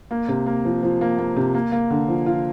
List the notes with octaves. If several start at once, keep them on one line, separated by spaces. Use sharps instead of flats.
A#3
C3
A#3
F3
F3
A#3
A#3
C3
A#3
A#3
D3
F3
F4